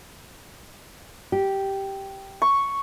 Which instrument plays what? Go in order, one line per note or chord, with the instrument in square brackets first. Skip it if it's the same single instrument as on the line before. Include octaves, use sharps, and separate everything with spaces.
[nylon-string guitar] G4
[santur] C#6